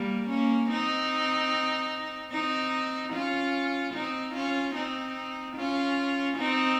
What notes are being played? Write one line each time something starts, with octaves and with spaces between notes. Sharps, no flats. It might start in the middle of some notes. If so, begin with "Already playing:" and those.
Already playing: G3 A#3
A#3 C#4
C4 D#4
C4 D#4
C#4 F4
C4 D#4
C#4 F4
C4 D#4
C#4 F4
C4 D#4